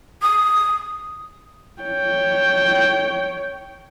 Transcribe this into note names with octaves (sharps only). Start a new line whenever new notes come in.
D#6
C#5 G5